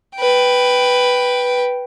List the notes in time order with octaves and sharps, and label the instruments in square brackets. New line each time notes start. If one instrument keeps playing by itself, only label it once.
[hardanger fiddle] B4 G5